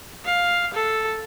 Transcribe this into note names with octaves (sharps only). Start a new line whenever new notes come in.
F5
A4